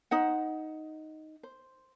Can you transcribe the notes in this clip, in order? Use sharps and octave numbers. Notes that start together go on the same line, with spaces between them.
D#4 C5 F#5
C5